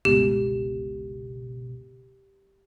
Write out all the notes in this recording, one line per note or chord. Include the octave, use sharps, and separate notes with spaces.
G1 C#2 B2 G4